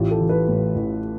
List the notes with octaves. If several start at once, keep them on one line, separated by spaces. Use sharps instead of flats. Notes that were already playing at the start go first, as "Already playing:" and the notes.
Already playing: A1 F4 G4
G4 A4
E3
A4 B4
A2
A1